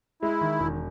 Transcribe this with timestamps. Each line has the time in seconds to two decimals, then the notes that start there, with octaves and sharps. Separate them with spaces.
0.22 G#3 E4
0.41 D#3
0.60 E1